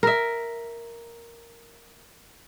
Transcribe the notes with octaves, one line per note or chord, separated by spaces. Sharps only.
A#4 E5